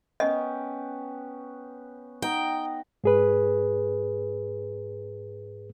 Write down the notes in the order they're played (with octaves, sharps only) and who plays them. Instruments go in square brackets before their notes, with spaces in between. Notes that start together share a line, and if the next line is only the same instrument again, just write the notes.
[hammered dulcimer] B3 C#4 [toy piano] D#5 [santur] G5
[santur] D#4 D#5 F#5 [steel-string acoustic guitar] G5
[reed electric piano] G#2 G#4 B4